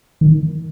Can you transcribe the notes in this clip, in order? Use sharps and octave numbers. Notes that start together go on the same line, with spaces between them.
D#3